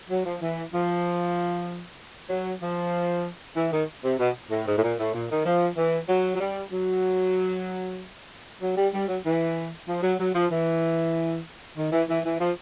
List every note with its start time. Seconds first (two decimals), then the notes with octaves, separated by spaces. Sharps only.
0.10 F#3
0.25 F3
0.41 E3
0.73 F3
2.29 F#3
2.61 F3
3.56 E3
3.72 D#3
4.04 C3
4.19 B2
4.51 A2
4.67 G#2
4.77 A2
4.83 A#2
4.98 A2
5.14 A#2
5.30 D#3
5.45 F3
5.77 E3
6.09 F#3
6.35 F#3
6.40 G3
6.71 F#3
8.61 F#3
8.76 G3
8.93 G3
9.08 F#3
9.25 E3
9.88 F3
10.03 F#3
10.19 F#3
10.34 F3
10.51 E3
11.77 D#3
11.92 E3
12.09 E3
12.24 E3
12.39 F3